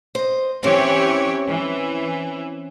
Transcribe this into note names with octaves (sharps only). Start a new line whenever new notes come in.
C5 D#5
E3 C4 C#4 G4 C#5
E3